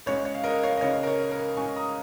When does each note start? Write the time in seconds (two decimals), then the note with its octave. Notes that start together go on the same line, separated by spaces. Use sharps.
0.06 C#2 C#3 G#3 C#5
0.25 C#5
0.35 F5
0.44 A#4 D#5
0.63 C#5 F5
0.77 D#5
0.81 C#2 C#3 G#3 C#5
1.03 A#4
1.07 C#5
1.31 A#4
1.57 C#2 C#3 G#3 G#5 C#6
1.76 A#5 D#6